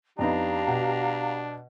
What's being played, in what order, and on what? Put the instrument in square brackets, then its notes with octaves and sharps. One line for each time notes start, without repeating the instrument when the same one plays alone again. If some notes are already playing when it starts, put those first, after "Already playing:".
[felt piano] F2 B3 D#4 [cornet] D4 [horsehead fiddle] G4 [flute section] F5 A#5
[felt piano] B2 F#5